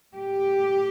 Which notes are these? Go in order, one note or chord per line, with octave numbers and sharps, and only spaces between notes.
A2 G4